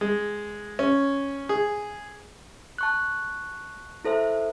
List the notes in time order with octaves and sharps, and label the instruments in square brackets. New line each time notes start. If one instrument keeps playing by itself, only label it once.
[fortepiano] G#3
C#4
G#4
[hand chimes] A5 C#6 F#6
E4 A4 C5 E5